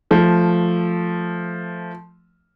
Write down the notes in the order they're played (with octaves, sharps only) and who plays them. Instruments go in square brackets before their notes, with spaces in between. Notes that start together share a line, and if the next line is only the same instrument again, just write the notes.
[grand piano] F3 A3